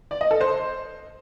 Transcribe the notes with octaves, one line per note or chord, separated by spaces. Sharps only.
D5
D#5
A4
C5